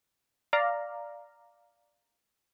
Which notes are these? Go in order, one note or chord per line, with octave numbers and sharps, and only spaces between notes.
D5 F5 A#5